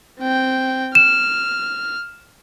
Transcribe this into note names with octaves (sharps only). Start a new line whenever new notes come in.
C4 G5
F6 E7